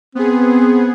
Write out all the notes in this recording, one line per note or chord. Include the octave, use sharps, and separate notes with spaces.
B3 C4 G#4